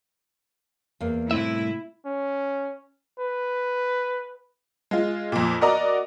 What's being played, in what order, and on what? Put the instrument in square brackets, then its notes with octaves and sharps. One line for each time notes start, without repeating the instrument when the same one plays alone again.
[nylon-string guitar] E2 A#3
[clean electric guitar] C2 A2 E5 [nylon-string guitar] C4 [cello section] E4
[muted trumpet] C#4
B4
[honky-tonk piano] G#3 F4
F2 A#2
F#4 A#4 D5 D#5 A#5 D6